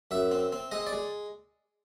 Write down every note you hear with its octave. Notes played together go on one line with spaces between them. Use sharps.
F#2 E5
C4
C4
G#3 D#5
D5
G#3